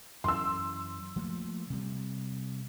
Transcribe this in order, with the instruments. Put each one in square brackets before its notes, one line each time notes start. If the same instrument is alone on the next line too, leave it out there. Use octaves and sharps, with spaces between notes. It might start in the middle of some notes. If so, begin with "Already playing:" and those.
[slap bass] F#2 E3 [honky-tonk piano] C6 E6
[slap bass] F3 A3 A#3
C3 G3